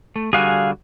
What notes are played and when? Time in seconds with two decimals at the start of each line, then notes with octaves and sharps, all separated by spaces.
0.16 A3
0.33 D3 G3 F#4 G#4 F5 G#5